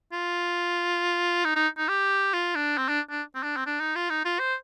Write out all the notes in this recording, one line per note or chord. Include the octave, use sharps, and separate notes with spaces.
F4
D#4
D#4
D#4
G4
F4
D4
C4
D4
D4
C4
D4
C4
D4
D#4
F4
D#4
F4
C5